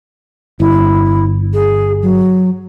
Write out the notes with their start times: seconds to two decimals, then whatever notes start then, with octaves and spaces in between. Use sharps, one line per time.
0.60 G1 E4
1.54 G#4
2.02 F#3